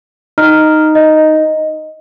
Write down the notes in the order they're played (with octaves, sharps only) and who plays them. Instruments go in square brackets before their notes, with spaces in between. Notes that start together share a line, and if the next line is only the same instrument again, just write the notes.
[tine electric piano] D#4 [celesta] F6
[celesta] D#5